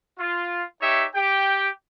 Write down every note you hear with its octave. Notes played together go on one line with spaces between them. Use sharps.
F4
D#4 G4 C#5 E5
G4 G5